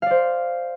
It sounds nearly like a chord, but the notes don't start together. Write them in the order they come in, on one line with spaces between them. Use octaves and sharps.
F5 D5 C5